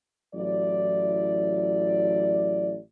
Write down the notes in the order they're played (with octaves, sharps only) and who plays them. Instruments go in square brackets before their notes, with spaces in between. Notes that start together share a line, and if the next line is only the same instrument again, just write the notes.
[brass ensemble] A1 F#3 E4 D5